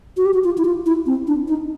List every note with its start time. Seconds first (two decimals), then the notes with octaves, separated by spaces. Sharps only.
0.17 F#4
0.25 G4
0.34 F#4
0.44 F4
0.58 E4
0.65 F4
0.86 E4
1.06 C4
1.27 D4
1.48 D#4